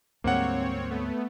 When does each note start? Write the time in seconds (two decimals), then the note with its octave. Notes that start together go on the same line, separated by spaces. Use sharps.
0.24 D2 G#2 G3 A#3 C4 C#5 F#5
0.90 A3 B3